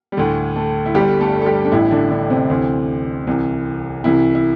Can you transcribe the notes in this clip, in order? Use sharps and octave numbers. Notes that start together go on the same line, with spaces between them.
G3
D2 A2 D3 A3
A3 A4
E4
G1 G2 D3 G3 G4
A3 A4
A4
G3 G4
D4
A1 A2 E3 E4
D3 D4
D3 D4
C3 C4
D2 C3 E3
C2 C3 E3
C2 C3 E3 E4
E4